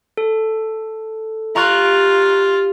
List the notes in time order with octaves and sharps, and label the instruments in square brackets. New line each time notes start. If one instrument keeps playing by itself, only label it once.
[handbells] A4
[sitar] G3 [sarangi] F4 [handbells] A#5 C#6 F#6